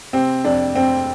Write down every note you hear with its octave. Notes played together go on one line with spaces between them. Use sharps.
C3 C4
F2 D4
F2 C4